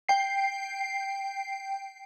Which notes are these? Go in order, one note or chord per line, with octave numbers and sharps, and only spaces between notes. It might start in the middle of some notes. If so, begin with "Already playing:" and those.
G5 C7